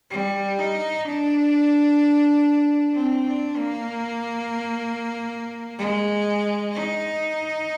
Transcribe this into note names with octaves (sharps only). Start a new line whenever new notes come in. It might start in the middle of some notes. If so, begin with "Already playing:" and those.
G3
D#4
D4
C4
D4
A#3
G#3
D#4